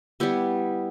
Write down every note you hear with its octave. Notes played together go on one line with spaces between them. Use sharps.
G3 B3 E4 G4